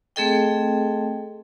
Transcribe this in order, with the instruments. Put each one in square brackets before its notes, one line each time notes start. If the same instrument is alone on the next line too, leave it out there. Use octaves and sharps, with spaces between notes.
[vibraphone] A3 C4 G#4 A4 D#5 G5